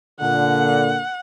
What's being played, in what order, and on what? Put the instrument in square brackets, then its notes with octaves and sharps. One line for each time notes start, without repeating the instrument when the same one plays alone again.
[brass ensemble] A#2 D3 [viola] F#5